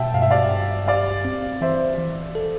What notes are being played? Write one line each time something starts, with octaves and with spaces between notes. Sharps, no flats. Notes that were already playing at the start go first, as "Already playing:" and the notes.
Already playing: B2 E5 G5 A5
G2 F5
E5
D5 F5
G2
G4 D5 F5
C4
E3 C5 E5
E3
A4